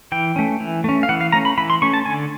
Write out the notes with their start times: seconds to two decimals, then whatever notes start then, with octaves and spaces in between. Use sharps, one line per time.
0.12 E3 G5
0.36 A3 C#4
0.60 E3
0.84 A3 C#4
1.03 F5
1.09 E3 F#5
1.21 F5
1.32 A3 C#4 A#5
1.45 B5
1.57 E3 B5
1.70 C6
1.82 A3 C#4 C#6
1.94 A5
2.05 D3 G#5